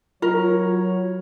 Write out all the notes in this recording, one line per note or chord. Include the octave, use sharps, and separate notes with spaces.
F#3 F4 A#4 C#5